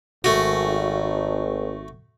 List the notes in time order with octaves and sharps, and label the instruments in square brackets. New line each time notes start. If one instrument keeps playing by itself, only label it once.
[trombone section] G#1 [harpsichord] A3 F#4